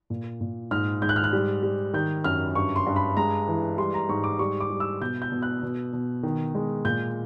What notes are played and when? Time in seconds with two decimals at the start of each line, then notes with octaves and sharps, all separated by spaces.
0.10 A#2
0.41 A#2
0.71 G#2 F6
1.02 G#2 G6
1.09 F#6
1.16 F6
1.24 F#6
1.33 G3
1.63 G3
1.93 D#3 G6
2.24 F#2 F6
2.55 G2 C#6
2.76 C6
2.86 G2
2.96 B5
3.17 G#3 A#5
3.48 E3
3.78 G3 C6
3.94 A#5
4.09 G#2 C#6
4.24 D6
4.39 G3 C#6
4.60 D6
4.70 G3
4.80 E6
5.01 B2 G6
5.22 G6
5.32 B2
5.42 F#6
5.63 B2
5.93 B2
6.23 D#3
6.55 G#3
6.85 A#2 G6